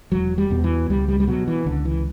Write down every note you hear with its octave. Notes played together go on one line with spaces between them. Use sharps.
E1 F#3
G3
E2 B2
E3
C#2 G3
G3
G3
B2 F#3
E3
C#2 D3
E3